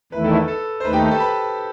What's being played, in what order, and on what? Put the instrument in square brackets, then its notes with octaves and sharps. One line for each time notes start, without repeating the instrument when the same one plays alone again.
[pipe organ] E2 D#3 A3 E4 [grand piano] B4
[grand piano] A4
A4
C5
[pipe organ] D#2 D#3 A3 D#4 [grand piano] B4
[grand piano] G4 G5
A4 A5
B4 B5